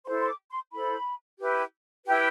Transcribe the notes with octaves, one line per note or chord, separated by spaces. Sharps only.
E4 A4 C5 C6
C6
D6
C6
E4 A4 C5 B5
E4 G4 B4
E4 G4 B4 G5